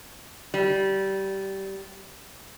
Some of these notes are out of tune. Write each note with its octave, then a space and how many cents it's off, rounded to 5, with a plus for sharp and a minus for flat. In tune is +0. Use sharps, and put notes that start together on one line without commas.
G3 -20